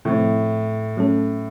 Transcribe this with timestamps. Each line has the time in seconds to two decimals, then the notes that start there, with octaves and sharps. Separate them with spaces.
0.05 A2 C3 F3 C4
0.97 F#3 A3 C#4 A4